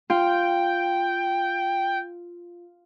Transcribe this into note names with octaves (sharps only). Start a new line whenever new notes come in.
F4 G5